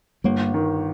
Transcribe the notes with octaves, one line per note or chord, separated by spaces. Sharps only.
G1 G3 A#3
D#3